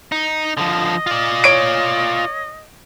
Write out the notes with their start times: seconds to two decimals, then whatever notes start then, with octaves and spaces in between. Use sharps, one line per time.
0.12 D#4
0.57 D3 F3 D#5
1.07 F4 D5
1.44 C#5 D7